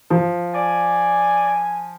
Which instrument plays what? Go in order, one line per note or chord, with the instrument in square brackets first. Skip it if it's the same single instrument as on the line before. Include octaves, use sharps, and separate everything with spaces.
[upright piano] F3
[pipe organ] D5 [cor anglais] G#5